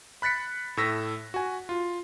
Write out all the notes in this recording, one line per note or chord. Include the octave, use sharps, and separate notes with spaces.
B5 F#6 A6 B6 C#7
A2 A3 E6 A#6 B6
F#4 G#5
F4